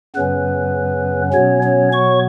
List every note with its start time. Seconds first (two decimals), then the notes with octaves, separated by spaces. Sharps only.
0.16 F#2 C#3 F#3 B3 C#4 B4
1.33 B2 F#3 B3 C#4 C#5
1.63 C#4 C#5
1.92 C#5 C#6